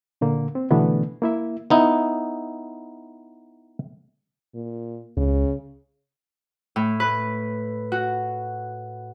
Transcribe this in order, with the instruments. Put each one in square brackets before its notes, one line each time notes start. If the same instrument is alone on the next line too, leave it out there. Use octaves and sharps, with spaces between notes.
[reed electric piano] A#2 D3 A#3
C4
B2 D3 E3 A3 B3 D4
A#3 E4 E5
[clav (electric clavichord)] B3 D#4 E4
[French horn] A#2
[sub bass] C#2 [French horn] C#3
[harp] A2
B4
F#4